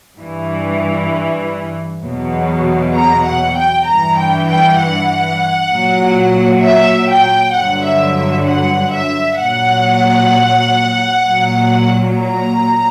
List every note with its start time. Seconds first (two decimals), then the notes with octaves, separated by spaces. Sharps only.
0.18 G2 E3
2.03 E2 B2 F#3
2.95 A#5
3.25 F#5
3.56 G5
3.86 G2 E3 A#5
4.17 G5
4.48 G5
4.78 F#5
5.71 A#2 F#3
6.63 E5
7.10 G5
7.55 G2 D3 F#3 F#5
7.86 E5
8.17 E5
8.47 F#5
8.94 E5
9.39 A#2 F#3 F#5
11.24 A#2 F#3
12.16 A#5